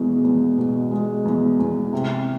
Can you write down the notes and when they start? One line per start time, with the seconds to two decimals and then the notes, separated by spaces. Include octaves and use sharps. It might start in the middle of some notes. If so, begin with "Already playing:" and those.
Already playing: E2 B2 G#3
0.24 E2
0.58 B2
0.91 G#3
1.25 E2
1.59 E2
1.93 C3